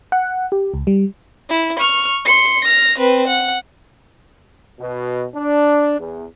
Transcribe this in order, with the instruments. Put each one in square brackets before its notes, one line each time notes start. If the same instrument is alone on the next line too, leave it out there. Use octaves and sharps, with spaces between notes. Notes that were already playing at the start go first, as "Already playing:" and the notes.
[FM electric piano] F#5
G4
C#2
G3
[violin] E4
C#6 F6
C6 C#7
F6 A#6
C4 B4
F#5
[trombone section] B2
D4
E2